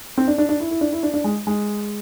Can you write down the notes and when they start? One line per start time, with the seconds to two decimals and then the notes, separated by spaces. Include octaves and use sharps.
0.18 C4
0.28 D4
0.38 D4
0.49 D4
0.60 E4
0.71 E4
0.81 D4
0.93 E4
1.03 D4
1.14 D4
1.24 G#3
1.47 G#3